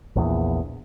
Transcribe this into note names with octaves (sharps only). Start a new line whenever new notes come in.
A#1 E2